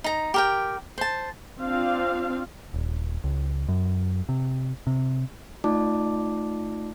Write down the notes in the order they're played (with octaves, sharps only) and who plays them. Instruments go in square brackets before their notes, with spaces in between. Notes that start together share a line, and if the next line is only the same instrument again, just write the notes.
[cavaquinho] D#4 A#5
G4 A#4 G5
C5 A5
[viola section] C4 D4 F4 F5
[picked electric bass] D#1
C#2
F#2
C3
C3
[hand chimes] A3 D#4 F4 D5 A5 D6